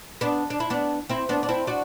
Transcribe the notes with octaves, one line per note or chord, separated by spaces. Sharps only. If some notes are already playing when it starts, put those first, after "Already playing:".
B3 D4
D4
E4
B3 D4
C4 E4
B3 D4
D4
C4 E4
D4 F#4